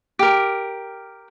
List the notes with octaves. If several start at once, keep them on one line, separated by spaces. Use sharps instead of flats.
G4 A#4